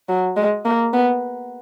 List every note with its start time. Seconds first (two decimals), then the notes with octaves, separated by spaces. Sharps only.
0.09 F#3
0.36 G#3
0.65 A#3
0.94 B3